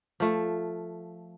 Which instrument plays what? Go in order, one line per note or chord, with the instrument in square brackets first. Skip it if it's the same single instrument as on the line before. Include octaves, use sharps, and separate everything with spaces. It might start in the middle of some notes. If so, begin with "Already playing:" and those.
[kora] F3 A3